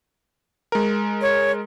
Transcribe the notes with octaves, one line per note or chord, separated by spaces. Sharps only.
G#3 A#4
C#5